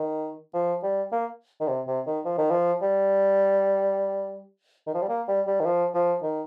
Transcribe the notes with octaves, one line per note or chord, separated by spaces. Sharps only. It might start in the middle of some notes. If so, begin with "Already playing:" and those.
Already playing: D#3
F3
G3
A#3
D#3
C3
C3
D#3
F3
D#3
F3
G3
D#3
F3
G3
A#3
G3
G3
D#3
F3
F3
D#3